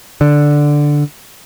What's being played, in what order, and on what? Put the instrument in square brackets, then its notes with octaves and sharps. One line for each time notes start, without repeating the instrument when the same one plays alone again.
[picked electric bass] D3